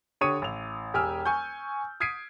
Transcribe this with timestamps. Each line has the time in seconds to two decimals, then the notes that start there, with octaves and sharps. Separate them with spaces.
0.21 D3 G4 C#5 C#6 D#6 D#7
0.42 A1 F7
0.94 E1 G4 G5 G#5 E6 F6
1.26 G#5 C#6 G6
2.00 D#6 G#6 B6 C7 D7 D#7